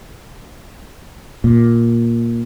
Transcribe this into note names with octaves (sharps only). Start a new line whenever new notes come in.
A#2